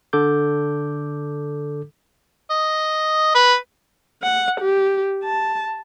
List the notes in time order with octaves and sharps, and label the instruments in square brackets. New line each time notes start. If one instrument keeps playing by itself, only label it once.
[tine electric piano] D3 A4 D6 G6
[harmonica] D#5
B4
[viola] F#5
G4
A5